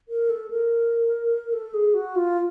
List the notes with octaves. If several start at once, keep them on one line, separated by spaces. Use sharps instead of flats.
A#4
A4
A#4
A4
G#4
F#4
F4